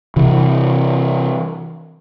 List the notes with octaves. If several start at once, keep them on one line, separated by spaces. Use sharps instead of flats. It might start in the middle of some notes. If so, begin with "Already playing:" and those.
C3 E3